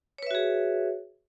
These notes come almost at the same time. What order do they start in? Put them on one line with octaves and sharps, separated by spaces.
C#5 B4 E5 F#4 G#4